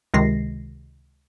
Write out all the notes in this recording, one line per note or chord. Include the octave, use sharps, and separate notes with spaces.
C#2 C3 D#3 G#3 A#6 C7